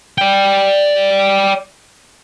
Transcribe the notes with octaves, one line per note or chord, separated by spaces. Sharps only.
D5 G5